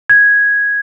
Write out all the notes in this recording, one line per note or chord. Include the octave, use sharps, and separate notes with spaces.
G#6